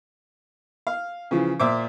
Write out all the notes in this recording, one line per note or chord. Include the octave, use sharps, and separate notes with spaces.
F5
C#3 E3 F3
A#2 C5 E5 D6